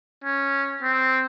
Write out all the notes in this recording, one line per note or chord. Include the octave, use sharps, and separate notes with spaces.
C#4
C4